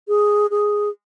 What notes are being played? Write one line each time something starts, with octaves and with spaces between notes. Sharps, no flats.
G#4
G#4